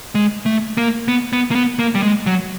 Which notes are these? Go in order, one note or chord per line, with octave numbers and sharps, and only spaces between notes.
G#3
A3
A#3
B3
B3
A#3
B3
A#3
G3
G#3
F#3